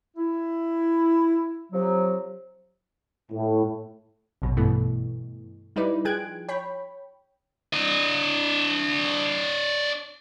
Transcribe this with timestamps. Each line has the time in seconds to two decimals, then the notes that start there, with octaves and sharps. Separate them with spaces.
0.17 E4
1.72 C3 F3 F#3
3.32 A2
4.42 A#1 F#2 B2
4.57 G2 B2 E3 A3
5.76 G3 D#4 E4 B4 D5
6.05 F3 G#4 G5 F#6 G#6 D7
6.49 C#5 G5 B5
7.73 D4 D#5